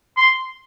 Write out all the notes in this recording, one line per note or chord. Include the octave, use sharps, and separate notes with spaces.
C6